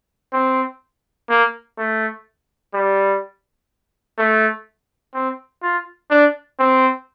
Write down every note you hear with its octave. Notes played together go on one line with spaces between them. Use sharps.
C4
A#3
A3
G3
A3
C4
F4
D4
C4